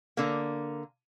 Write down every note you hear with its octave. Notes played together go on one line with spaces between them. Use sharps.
D3 A#3